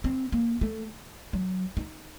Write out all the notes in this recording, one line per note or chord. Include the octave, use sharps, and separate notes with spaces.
C4
A#3
A3
F#3
D#4